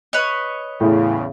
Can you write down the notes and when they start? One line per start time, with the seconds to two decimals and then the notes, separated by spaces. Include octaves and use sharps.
0.13 B4 C#5 D#5
0.81 E2 A2 C#3